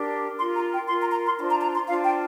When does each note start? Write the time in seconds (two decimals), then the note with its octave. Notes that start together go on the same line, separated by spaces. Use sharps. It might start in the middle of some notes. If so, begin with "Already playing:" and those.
Already playing: D4 G4 A#4
0.37 F4 A#4 C6
0.54 A#5
0.71 G5
0.88 F4 A#4 C6
1.00 A#5
1.12 A#5
1.25 C6
1.37 D4 F4 C5 C6
1.50 A#5
1.62 A#5
1.75 C6
1.87 D4 F4 C5 F5
2.04 G5